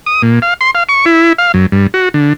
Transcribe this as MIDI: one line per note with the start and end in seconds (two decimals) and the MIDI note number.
0.06 0.22 87
0.22 0.39 46
0.42 0.54 77
0.61 0.71 84
0.75 0.83 77
0.89 1.05 85
1.06 1.33 64
1.38 1.52 77
1.54 1.66 42
1.72 1.87 43
1.94 2.09 66
2.14 2.33 50